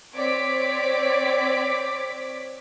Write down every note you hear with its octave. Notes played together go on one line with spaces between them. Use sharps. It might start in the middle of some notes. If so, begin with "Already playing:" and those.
C4 C#5 D5 D6 B6 D7